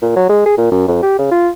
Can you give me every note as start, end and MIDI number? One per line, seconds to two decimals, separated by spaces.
0.02 0.12 46
0.16 0.27 54
0.29 0.41 56
0.46 0.55 68
0.58 0.72 46
0.72 0.86 42
0.88 1.02 41
1.03 1.16 67
1.19 1.29 49
1.31 1.49 65